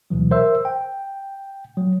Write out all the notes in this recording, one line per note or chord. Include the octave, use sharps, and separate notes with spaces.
D2 B2 E3 F#3
A#4 C5 E5 E6
G5
F#3